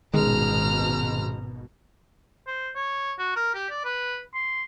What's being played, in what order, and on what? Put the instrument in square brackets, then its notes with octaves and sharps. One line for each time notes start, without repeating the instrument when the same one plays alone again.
[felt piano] D#1 G#3 [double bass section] G#1 B2 [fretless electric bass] D#3 [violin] A#5 F6
[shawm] C5
C#5
F#4
A#4
G4
D5
B4
C6